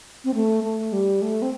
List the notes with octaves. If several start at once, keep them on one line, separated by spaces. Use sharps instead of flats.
C4
A3
A3
G3
A3
C4